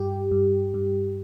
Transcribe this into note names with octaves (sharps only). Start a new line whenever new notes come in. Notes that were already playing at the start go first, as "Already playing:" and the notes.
Already playing: G2 G4
G2
G2